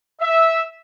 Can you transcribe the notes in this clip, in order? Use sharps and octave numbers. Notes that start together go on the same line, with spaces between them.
E5